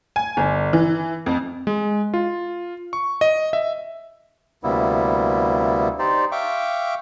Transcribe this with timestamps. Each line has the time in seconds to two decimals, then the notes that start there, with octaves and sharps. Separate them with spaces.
0.16 G#5
0.37 G1
0.73 E3
1.26 F2
1.67 G#3
2.14 F4
2.93 C#6
3.21 D#5
3.53 E5
4.64 D2 C3 G3 A#3 B3 E4
5.99 D#4 G4 C5 D5
6.32 E5 F5 G5 C#6 D6